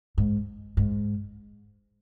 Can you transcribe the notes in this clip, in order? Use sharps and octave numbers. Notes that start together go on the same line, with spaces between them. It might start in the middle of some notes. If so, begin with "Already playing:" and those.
G#2
G#2